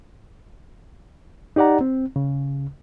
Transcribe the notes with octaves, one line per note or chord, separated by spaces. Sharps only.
D#4 G4 D5 F#5 A#5
C4
C#3